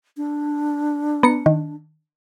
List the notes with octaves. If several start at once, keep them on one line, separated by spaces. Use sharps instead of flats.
D4
B3 A#5 C#7
D#3